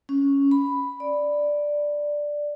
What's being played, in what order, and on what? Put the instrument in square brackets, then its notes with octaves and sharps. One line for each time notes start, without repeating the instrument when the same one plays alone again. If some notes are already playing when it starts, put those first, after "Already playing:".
[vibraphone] C#4
B5
D5